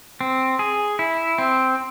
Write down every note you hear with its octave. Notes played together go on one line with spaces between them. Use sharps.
C4
G#4
E4
C4